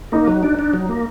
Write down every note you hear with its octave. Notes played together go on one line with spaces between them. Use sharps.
A#3 D#4
F#3
D4
D4
F#3
A#3